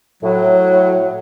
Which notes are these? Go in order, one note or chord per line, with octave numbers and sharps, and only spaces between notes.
A2 F#3